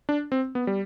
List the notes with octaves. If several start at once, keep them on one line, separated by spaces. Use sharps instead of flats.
D4
C4
B3
G3